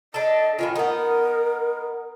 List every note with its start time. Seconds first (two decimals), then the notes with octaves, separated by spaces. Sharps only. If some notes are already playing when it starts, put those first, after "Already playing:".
0.14 D4 A4 D#5
0.59 A2 D#3 C#4 F4
0.76 B3 D#4 A#4